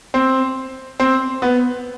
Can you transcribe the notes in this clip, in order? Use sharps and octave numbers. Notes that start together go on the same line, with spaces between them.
C4
C4
B3